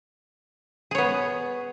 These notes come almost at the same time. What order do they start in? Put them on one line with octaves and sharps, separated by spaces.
G#4 C#5 B3